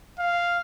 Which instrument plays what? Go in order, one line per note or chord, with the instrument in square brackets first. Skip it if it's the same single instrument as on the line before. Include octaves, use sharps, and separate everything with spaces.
[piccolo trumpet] F5